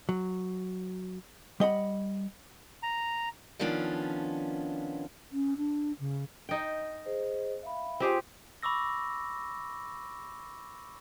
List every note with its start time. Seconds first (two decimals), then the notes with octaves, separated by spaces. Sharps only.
0.09 F#3
1.60 G3 D#5 F#5 B5
2.83 A#5
3.59 D#3 F3 B3 C#4 D4 F4
5.32 C#4
5.57 D4
6.00 C#3
6.49 D#4 G5
7.05 G#4 C5 D#5
7.63 E5 F5 B5
8.00 C4 F4 G4 G#4
8.63 B5 C#6 D6 E6 A#6